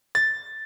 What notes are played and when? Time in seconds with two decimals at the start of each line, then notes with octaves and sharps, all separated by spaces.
0.15 A6